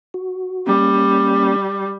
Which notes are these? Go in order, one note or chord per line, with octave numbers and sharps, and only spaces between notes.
F#4
G3 A#3 C#4